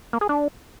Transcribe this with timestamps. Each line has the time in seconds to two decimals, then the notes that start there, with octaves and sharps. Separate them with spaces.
0.13 A#3
0.21 G#4
0.29 D4